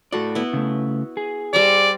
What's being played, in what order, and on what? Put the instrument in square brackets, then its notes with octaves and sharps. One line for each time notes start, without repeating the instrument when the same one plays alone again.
[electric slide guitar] A2 A4 D5 [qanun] F#4
[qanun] B3 E4
[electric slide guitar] C#3 A3
G#4
[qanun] G3 C5 A#5 [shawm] D5